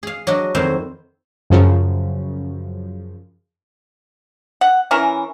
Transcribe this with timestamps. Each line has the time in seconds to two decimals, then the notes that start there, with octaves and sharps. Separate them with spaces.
0.03 G#4 F5
0.27 F#3 D4 F#4 D#5
0.55 F2 D#3 F#3 E4 C5
1.50 F#2 C#3 F3
4.61 F#5
4.91 E3 C#4 E4 A#4